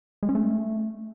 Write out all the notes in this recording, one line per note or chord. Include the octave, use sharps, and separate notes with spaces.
G#3
C#4
A3